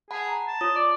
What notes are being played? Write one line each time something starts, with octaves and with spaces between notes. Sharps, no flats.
G#4 F#5 A5 B5
A#5
A5
F4 C#5 D#6
D5 A6